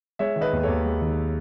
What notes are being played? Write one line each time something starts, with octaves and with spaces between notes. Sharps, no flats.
G#3 C#5 E5
D#3
B4 D#5
D#2
D#2 A4 C#5
G#3
D#3